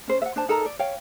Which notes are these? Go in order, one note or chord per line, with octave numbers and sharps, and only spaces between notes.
C#4 C5
E5 F#5
D4 C5 A5
D#4 A4 A#4 A#5
D5
C#5 F5 G5